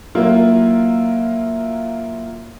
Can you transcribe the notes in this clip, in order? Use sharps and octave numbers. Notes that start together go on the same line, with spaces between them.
F#3 A#3 E4 F4